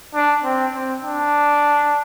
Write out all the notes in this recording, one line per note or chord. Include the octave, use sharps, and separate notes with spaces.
D4
C4
C4
D4